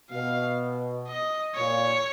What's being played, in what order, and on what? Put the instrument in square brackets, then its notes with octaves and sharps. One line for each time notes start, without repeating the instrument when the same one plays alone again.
[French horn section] B2 [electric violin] F5
[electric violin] D#5
[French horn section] A#2 [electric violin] C#5